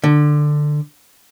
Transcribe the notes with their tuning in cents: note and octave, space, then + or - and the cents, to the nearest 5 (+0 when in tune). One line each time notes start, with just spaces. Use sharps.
D3 +15